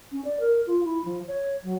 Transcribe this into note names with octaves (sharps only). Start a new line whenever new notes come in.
C#4
D5
A#4
F4
E4
F3
C#5
F#3